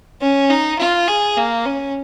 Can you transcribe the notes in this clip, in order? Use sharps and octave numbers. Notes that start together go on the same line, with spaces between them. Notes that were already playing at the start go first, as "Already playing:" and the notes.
C#4
D#4
F4
G#4
A#3
C#4